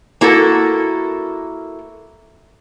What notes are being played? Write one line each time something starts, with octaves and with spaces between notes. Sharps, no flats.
A#3 E4 F#4 A4 A#4